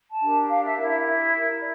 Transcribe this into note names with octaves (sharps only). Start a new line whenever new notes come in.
A5
D4 G4 A#4
F5
E5
E4 G4 A#4 E5
E5
E5
E4 A#4
D5